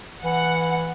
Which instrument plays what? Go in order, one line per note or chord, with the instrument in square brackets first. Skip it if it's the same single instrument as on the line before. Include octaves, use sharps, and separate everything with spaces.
[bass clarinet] E3 [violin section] F#5